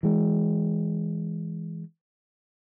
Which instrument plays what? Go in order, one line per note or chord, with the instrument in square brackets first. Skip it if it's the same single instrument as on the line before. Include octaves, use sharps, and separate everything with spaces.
[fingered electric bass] E3 G#3